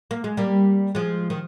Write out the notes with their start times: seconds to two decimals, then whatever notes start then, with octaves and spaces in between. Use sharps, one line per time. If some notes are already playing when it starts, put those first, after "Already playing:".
0.11 A#3
0.24 G#3
0.37 G3 A#3
0.95 F3 G#3
1.30 D#3